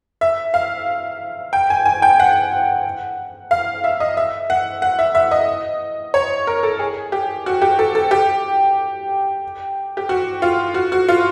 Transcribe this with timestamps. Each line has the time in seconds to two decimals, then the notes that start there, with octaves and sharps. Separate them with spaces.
0.21 E5
0.54 F5
1.53 G5
1.70 G#5
1.85 G#5
2.02 G5
2.20 F#5
3.51 F5
3.84 E5
4.00 D#5
4.17 E5
4.50 F#5
4.82 F#5
4.99 E5
5.15 E5
5.31 D#5
6.14 C#5
6.47 A#4
6.63 A4
6.79 G#4
7.12 G4
7.46 F#4
7.62 G4
7.79 A4
7.95 A4
8.11 G4
9.97 G4
10.09 F#4
10.42 F4
10.74 F#4
10.92 F#4
11.08 F4